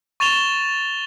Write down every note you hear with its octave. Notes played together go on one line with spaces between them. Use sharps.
C#6 A6 E7 F7 G7